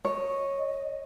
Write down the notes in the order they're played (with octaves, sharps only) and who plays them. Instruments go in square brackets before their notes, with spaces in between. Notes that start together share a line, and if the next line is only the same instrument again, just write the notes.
[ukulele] C#5 [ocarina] D#5